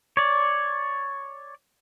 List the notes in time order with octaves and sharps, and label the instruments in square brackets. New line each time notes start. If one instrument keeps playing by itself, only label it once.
[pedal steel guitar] C#5 D5